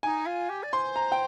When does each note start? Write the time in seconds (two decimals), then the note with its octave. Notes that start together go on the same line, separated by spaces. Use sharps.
0.03 D#4 G#5
0.26 F4
0.49 G4
0.63 D5
0.73 C5 C6
0.96 A#5
1.12 G5